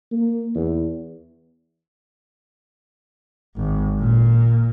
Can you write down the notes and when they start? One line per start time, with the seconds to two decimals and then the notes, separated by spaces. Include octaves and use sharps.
0.11 A#3
0.55 E2
3.56 G#1
3.99 A#2